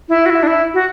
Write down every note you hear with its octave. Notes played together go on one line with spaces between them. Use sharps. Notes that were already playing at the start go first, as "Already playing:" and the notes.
E4
F#4
E4
D4
E4
F#4